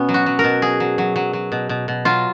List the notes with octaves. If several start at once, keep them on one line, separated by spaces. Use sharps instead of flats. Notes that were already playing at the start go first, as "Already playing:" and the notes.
Already playing: B2 B3 C#4
F#3
F#4
F#3
A#4
B2
F#3 G#4
F#3
F#3
F#3
F#3
B2
B2
B2
F#3 F4